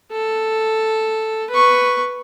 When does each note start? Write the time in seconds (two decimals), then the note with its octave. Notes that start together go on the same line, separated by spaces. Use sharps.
0.12 A4
1.50 B4 C#6